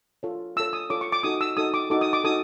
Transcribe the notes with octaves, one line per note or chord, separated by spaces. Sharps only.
F4 A4 C#5
F4 A4 C#5 E6
D#6
F4 A4 C#5 D6
C#6
D6
D#4 F#4 A4 D#6
E6
D#4 F#4 A4 D#6
D6
D#4 F#4 A4 D6
D#6
D6
D#4 F#4 A4 D#6